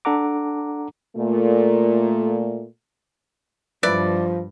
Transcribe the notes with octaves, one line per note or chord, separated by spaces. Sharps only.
D4 A4 F#5 A#5 D6
A#2 A3
G2 F3 E4 B4 D5